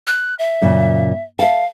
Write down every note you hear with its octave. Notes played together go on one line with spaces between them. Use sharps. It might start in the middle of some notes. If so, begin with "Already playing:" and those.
F#6
E5
F#2 A#2 C#3
E5 F5 A5